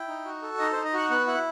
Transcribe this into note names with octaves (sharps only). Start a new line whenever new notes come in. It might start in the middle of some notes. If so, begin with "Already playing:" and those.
Already playing: E4 G5
D#4
F#4
A4
D#4 D#5
D#4 C5
D#5
F#4 F#5
B3 F#5
E4 F#5